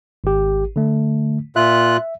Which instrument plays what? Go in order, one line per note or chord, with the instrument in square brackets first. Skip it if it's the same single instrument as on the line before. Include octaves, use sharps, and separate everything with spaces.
[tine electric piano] G#1 G4
D3 A3
[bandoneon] A#2 F4 F#6 [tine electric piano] E5